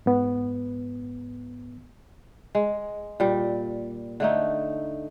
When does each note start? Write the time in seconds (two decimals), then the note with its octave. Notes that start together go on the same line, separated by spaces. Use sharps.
0.06 G#2 B3
2.55 G#3
3.20 A#2 G3
4.20 D3 A3 D#4